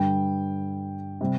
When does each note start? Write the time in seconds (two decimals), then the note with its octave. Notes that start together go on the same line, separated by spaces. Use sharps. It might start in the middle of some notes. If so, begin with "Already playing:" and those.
Already playing: G2 D3 G3 G5
1.21 C3 G3